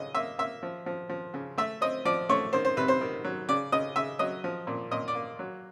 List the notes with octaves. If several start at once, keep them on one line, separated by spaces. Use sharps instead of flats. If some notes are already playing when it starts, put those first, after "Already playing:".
Already playing: C#3 D#5
A#3 E5
A#3 E5
F3
F3
F3
C#3
A3 E5
C4 D#5
F3 D5
A3 C#5
D#3 C5
C5
C3 B4
C5
D#3
F#3
C#3 D5
C#3 D#5
C#3 E5
F#3 D#5
F3
A#2
A#2 D#5
D5
A#3
F#3